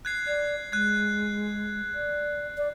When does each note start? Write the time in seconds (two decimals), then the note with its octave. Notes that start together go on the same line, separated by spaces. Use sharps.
0.05 F#6 G#6 C7
0.28 D5 G#6
0.72 G#3 F#6 G#6
1.95 D5
2.58 D5